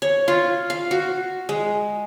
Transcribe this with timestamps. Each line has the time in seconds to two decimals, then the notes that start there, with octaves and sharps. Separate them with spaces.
0.02 C#5
0.28 F4
0.70 F5
0.91 F#4
1.49 G#3